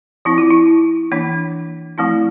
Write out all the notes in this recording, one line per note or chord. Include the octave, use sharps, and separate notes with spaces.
F3 C4 E4
F4
E4
E3 A#3 D4
F3 A3 C4 E4